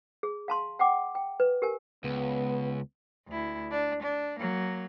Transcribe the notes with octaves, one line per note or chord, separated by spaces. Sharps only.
G#4
F5 A5 C6
F#5 G5 D6
G5
B4
G4 A#4 G#5
C#2 B3
D2 E4
D4
D4
F#3 A#3